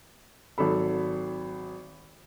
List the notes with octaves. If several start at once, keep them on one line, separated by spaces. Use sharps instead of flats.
G#1 F#3 A4 B5